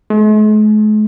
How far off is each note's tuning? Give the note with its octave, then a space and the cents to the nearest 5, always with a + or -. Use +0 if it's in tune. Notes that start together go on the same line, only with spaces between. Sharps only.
G#3 +45